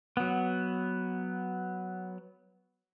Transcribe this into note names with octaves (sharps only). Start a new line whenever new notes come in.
F#3 B3